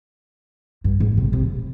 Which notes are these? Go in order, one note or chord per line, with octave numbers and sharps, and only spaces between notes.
G2
G#2
C3
C3